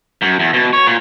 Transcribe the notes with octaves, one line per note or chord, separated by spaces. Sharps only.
F#2
E2
B2
C#5
A#2